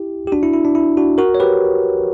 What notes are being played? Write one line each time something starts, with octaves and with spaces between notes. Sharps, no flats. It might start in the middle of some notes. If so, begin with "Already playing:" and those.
Already playing: E4 G4
G4
D4 F#4
E4
E4
D4
E4
D4 F#4
F#4 A#4
C#5
G4 B4